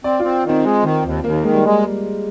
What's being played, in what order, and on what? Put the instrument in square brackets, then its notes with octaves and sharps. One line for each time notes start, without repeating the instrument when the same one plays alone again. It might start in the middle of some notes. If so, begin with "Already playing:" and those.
[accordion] C4 [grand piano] D5
[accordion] C4 [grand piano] F4
[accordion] D#3 [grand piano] C4
[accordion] G#3
D#3
D#2
[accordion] D#2 [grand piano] A#3
[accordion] D#3 [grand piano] G#3
[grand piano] G3
[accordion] G#3